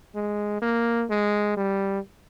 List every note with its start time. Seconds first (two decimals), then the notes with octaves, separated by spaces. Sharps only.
0.15 G#3
0.62 A#3
1.10 G#3
1.57 G3